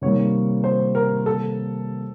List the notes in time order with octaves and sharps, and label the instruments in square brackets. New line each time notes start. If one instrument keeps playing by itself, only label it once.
[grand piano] C3 D#3 G3 A#3 [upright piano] C#5
[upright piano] C5
A#4
A4